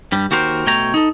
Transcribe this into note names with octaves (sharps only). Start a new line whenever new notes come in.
G2 G3
D#2 F#4 G4 A#4 C5
B2 A3 C#5 G5 A#5
D#4 A4